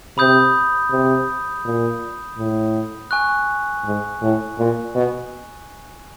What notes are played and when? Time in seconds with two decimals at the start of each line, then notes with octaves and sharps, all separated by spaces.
0.18 C3 B5 D#6 G6
0.91 C3
1.65 A#2
2.38 A2
3.11 G#5 C#6 F#6
3.85 G#2
4.22 A2
4.58 A#2
4.95 B2